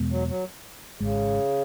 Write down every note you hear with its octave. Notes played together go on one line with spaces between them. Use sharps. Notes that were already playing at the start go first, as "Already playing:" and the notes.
Already playing: E2 B2 G#3 B3
F#3
F#3
G#1 G#2 C#3 G#3